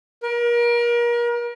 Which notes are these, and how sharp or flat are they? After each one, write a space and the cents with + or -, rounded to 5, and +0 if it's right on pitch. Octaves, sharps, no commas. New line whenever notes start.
A#4 +35